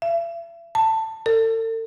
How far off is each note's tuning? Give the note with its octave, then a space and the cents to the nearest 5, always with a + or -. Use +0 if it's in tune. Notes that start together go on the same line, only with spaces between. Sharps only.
E5 +40
A5 +15
A4 +40